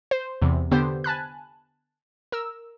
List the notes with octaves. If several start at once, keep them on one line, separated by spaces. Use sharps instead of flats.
C5
E2 C3 E3
D3 B3 G4 C5
G#5 A5 B5 F#6
A#4 E6